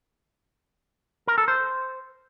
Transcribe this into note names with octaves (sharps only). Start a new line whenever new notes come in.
A#4
A4
C5